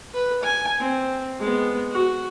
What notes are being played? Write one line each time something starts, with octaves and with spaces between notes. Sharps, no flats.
B4
G#5
C4
G#3 B3
F#4